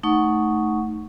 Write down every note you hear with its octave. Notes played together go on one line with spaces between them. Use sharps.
A3 D#4 F#5 C#6